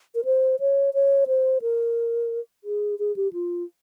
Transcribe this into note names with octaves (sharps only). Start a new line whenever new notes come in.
A#4
C5
C#5
C#5
C5
A#4
G#4
G#4
G4
F4